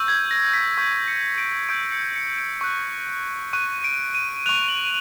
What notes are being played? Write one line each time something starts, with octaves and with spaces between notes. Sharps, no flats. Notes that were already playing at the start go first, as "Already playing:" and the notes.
Already playing: C#6 E6 G6
G#6
A#6
B6
C#6 E6 G6 B6
C#7
D7
C#6 E6 G6 D7
C#7
C#7
D7
C#6 F#6
C#6 F#6 D#7
D7
D#7
C#6 F#6 F7
F#7